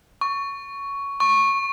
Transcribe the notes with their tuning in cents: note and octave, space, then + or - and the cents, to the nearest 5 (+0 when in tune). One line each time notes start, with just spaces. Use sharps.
C#6 +10
C#6 -10